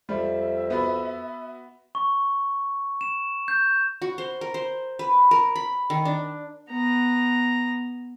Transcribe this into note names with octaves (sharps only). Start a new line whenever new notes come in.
F2 G3 E5
B3 F#4 B4
C#6
E7
G6
F#4
C5
A#4
C5
B4
A#4
B5
D#3
D4
B3 A#5